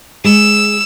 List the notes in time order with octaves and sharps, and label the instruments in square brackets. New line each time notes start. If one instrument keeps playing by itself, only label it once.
[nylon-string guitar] G#3 [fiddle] E6